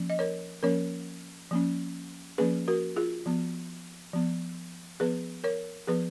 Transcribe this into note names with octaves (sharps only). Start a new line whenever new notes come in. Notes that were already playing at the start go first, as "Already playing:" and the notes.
Already playing: F3 A#3 C#4
D#5
A#4 C#5
F3 A#3 C#4 A#4 C#5
F3 A#3 C#4
F3 A#3 C#4 G#4 B4
F#4 A#4
F4 G#4
F3 B3
F3 B3
F3 B3 G#4 B4
A#4 C#5
F3 B3 G#4 B4